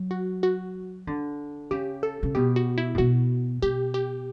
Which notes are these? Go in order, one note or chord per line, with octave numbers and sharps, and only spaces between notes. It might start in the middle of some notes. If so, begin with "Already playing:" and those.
Already playing: F#3
F#4
F#4
D3
C#3 G4
A4
C#3
B2 G4
F#4
E4
A2
B2 F#4
B2 G4
G4